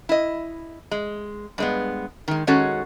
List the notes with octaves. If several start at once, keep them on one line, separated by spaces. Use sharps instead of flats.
E4 D#5
G#3
G2 G#3 B3
D#3 G#3
D#3 G#3 C#4 F#4 A4